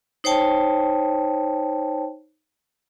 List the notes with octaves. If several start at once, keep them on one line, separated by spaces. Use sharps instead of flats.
D#4 C5 C#5 G5 A5